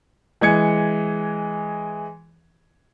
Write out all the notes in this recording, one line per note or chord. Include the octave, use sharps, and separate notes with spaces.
E3 G#3 G#6 C#7